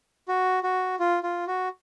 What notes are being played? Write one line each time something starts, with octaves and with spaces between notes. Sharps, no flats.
F#4
F#4
F4
F4
F#4